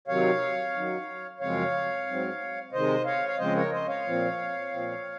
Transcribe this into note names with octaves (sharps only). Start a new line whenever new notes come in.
C3 D#3 F#3 C4 C#5 F5
F#2 D#3 F#3
F#2 C#3 F3 G#3 C4 C#5 F5
G#2 F#3 C4
C3 D#3 G#3 C5 D#5
C#5 F5
F5
C#3 F3 G#3 C4 C5 D#5
A#4 C#5
C5 D#5
C#5 F5
A#2 F3 C4
A#2 F3 C4